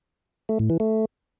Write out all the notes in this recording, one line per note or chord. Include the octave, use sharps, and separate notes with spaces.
A3
A2
E3
A3